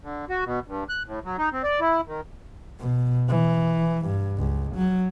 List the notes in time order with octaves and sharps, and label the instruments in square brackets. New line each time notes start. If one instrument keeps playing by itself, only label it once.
[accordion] D3
F#4
B2
G2
F#6
A2
F#3
D#4
C4
D5
E4
D#3
[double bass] B2
E3
G2
C#2
F#3